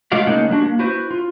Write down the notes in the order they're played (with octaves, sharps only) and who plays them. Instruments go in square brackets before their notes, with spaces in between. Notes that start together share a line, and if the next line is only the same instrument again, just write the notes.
[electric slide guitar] G#3 A3 F4 F#4 D5 F5
A2 C#3 A#3 D#4 G#4 F#5
D3 G3 C#4 D4 F#4
A#3
E4 F#4 B4 C5
F4